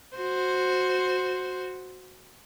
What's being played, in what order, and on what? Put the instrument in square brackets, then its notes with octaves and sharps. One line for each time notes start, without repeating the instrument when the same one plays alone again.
[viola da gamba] F#4 C5